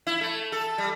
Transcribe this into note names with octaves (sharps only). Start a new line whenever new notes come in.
E4
A3
A4
G3